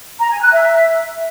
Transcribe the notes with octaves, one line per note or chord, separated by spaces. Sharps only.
A#5
G#5
F#6
E5